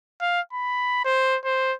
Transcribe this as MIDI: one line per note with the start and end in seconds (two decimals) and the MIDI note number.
0.21 0.40 77
0.53 1.02 83
1.05 1.37 72
1.45 1.74 72